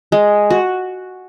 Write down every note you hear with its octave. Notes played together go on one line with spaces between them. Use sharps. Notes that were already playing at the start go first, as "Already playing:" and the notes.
G#3
F#4